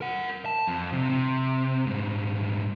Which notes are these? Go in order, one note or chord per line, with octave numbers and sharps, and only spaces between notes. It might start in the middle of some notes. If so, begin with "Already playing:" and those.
A#4 F#5
A5
F2
C3
C3
G#2 G3